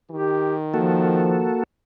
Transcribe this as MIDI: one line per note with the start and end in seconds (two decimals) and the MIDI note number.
0.11 1.53 51
0.11 0.54 67
0.74 1.50 53
0.74 1.63 58
0.74 1.63 66
0.74 1.63 69